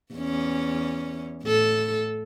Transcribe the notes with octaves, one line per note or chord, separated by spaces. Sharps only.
E2 C#4
A2 A4